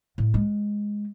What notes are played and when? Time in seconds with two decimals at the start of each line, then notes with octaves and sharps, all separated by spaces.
0.18 A2
0.34 G#3